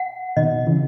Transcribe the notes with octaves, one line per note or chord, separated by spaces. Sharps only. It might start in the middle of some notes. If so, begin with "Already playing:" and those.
Already playing: F#5
B2 D#3 D#5
C#3 E3